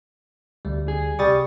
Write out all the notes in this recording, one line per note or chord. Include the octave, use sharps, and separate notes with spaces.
D2 G3
G#4
C2 G3 C#6 D#6 A6